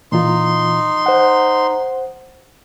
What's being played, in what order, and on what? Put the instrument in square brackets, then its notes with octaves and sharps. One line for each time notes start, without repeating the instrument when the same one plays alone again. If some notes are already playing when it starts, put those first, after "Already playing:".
[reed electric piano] A#2 E3 F4 [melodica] D#4 C6
[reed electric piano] C5 F#5